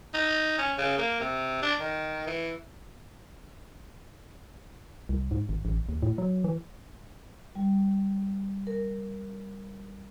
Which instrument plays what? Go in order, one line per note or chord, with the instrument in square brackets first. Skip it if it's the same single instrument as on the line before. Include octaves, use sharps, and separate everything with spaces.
[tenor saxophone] D#4
C#4
C#3
A#3
C3
D4
D#3
E3
[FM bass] C2
G#2
G#1
A1
D#2
A2
F#3
E3
[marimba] G3
A#4